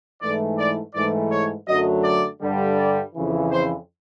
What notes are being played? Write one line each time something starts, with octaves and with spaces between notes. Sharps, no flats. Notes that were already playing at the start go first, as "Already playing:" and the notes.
G#2 E3 A3 D5
D5
G#2 E3 A3 D5
C#5
F#2 D3 F#3 A3 D#5
D5
G2 D3 G3
D5
F2 C#3 E3
C5